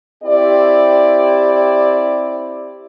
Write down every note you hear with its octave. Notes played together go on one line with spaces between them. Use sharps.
C4 E4 G4 D5